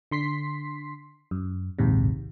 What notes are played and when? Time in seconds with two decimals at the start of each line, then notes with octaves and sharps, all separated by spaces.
0.11 D3 C6 B6 C7
1.31 F#2
1.79 A#1 D#2 G#2 C3